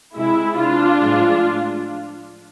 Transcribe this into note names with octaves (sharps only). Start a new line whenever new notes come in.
C3 G#3 E4
D4 F4
A2 F3 G#3